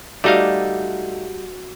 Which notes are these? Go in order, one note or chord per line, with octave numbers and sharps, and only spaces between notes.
G3 A3 D#4 F#4 D5 F5